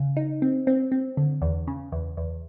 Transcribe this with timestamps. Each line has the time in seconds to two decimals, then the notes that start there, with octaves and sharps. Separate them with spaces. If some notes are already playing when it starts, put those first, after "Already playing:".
Already playing: C#3
0.17 D#4
0.42 C4
0.67 C4
0.92 C4
1.17 D3
1.42 E2
1.67 C#3
1.92 E2
2.17 E2